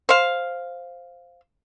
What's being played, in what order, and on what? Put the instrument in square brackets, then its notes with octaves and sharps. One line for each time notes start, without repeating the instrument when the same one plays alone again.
[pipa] C5 F5